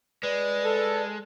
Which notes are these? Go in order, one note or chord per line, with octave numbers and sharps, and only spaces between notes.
G#3 B4 D5
A4